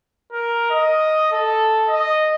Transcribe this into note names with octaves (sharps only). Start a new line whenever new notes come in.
A#4
D#5
A4
D#5